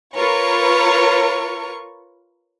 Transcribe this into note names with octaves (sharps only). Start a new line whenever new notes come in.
F4 A#4 B4 C#5 C#6